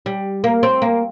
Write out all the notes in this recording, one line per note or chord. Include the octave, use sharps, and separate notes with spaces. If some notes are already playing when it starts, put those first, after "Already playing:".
G3
A#3
C4
A#3